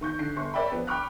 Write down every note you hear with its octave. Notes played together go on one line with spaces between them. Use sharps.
D#3 C#6 G6
D3 C7
G1 C6 C#6
A#4 C#5 D5 E5 G5 B5
F3 B3
G5 B5 C#6 D6 F6 F#6